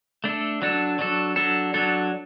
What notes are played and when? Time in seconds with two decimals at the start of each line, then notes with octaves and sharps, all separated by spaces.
0.24 A3 D4 A4
0.62 F#3 D4 A4
0.99 F#3 D4 A4
1.36 F#3 D4 A4
1.74 F#3 D4 A4